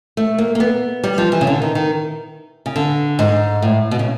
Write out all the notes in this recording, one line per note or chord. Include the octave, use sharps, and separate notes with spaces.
A3
A#3
A#3
B3
G3
F3
E3
C#3
D3
D#3
D#3
C#3
D3
G#2
A2
B2
C#3